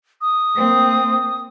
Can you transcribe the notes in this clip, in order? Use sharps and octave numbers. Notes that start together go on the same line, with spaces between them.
D#6
A#3 C4